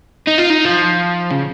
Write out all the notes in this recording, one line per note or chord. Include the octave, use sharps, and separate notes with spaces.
D#4
F4
D#4
F3
C#3